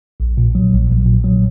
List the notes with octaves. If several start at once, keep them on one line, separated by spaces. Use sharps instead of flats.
A#1
A#2
F#3
A#1
A#1
A#2
F#3